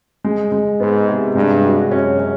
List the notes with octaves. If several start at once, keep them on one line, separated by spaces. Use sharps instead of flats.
G#3
G#3
G#2 B3
C3
G2 G#3
F#4
F#2 C#4
C#4